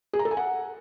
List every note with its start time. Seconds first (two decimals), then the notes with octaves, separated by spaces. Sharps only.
0.13 G#4
0.19 A#5
0.25 A4
0.31 G#5
0.37 F#5